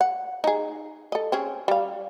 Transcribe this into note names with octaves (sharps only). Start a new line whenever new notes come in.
F#5
D#4 G#4
A4 D#5
C4 C#4 G#4
G3 F5